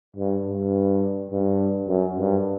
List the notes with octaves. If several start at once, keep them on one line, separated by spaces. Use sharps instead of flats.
G2
G2
G2
F#2
G2